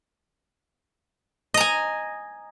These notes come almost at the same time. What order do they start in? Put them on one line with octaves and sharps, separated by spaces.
D#5 A#5 G#5